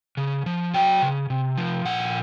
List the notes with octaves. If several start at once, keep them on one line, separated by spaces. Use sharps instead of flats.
C#3
F3
F#3 G5
C#3
C3
F3
A#2 F#5